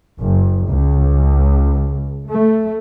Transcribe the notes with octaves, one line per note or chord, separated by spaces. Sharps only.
F#1
C#2
A3